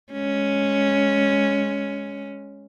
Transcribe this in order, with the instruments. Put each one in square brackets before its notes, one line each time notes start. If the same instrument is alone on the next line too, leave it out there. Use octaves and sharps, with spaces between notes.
[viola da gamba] G#3 C#4